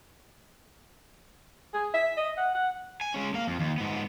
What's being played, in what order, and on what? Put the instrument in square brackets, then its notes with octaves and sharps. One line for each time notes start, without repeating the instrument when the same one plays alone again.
[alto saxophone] G#4
E5
D#5
F#5
F#5
[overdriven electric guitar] G#5
G#3 C#4
A#3 F5
F2
D#2
G#2 B3